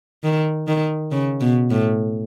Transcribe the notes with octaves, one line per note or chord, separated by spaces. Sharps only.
D#3
D#3
C#3
B2
A2